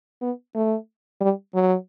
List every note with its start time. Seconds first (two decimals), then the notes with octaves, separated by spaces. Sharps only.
0.22 B3
0.55 A3
1.21 G3
1.55 F#3